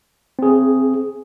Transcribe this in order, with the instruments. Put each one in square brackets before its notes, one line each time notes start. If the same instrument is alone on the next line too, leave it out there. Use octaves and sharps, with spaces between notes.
[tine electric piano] C4 G#4